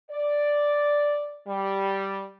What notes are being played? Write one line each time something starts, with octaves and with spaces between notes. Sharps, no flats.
D5
G3